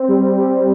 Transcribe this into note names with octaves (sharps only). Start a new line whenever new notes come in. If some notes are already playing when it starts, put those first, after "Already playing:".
Already playing: C4
G3
G3